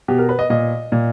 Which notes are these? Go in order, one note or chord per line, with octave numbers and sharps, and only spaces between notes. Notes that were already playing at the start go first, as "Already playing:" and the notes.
B2 G4
A#4
B4
D#5
A#2 D#5
A#2